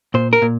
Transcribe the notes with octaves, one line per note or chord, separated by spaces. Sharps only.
A#2 C5
A#4
A#2